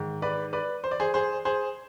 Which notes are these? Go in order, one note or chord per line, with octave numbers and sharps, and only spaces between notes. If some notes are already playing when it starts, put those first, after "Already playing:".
Already playing: G#2 D#3
B4 D5
B4 D5
C5
D5
G#4 C5
G#4 C5
G#4 C5